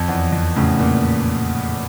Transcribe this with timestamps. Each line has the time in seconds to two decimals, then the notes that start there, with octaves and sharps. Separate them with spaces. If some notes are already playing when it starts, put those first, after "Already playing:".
Already playing: F2
0.08 E2
0.32 F2
0.56 A2 C#3
0.80 A#2